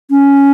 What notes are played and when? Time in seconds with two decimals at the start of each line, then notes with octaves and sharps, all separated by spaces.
0.11 C#4